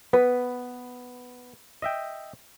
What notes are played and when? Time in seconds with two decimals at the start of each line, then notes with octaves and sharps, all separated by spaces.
0.13 B3 B4
1.82 D#5 E5 G5